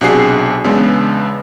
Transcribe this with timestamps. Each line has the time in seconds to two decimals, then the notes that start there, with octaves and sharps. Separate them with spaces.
0.01 B1 C3 D4 F#4 G#4 C7
0.64 E2 C#3 G#3 B3 D4